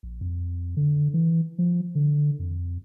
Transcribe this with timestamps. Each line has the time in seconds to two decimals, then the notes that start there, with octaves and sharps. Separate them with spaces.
0.03 A#1
0.21 F2
0.77 D3
1.14 E3
1.58 F3
1.95 D3
2.39 F2